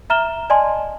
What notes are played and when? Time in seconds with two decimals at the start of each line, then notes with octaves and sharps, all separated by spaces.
0.10 E5 A#5 F6 E7 G7
0.50 D5 D#5 G#5 A5 C6